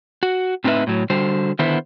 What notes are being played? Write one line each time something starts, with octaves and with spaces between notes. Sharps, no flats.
F#4
A2 C4 D#4 G4 B4 E5
A2 F#3
D3 G3 F#4 C5
D3 D#3 B3 E4 C5